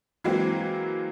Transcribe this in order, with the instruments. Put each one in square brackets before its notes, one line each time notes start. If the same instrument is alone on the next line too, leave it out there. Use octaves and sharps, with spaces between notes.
[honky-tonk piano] E3 F#3 G#3 A#3 C4